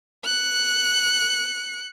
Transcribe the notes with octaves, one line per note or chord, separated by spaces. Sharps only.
F#6 C#7